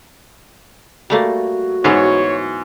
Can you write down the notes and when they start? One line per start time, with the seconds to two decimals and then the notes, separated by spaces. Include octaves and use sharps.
1.10 G3 A3 A#3 F#4
1.84 G#2 E3 F#3 B3 C#5